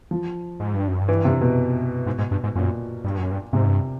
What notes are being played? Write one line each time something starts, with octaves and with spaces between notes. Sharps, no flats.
F3
G#2
G2
F#2
G2
E3
C3
B2
G#2
G#2
G2
G#2
F#2 A#2
G2
F#2
G2
G#2 C3
G2